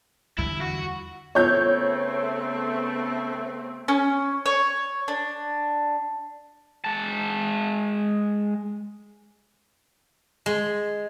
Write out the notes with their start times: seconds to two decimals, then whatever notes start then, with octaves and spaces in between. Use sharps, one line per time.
0.39 E2 D3 G3 E4
0.62 F#4
1.35 C#3 A3 B3 C4 C#5 G6
3.88 C#4
4.46 C#5
5.08 D4
6.84 G#3 A5
10.46 G#3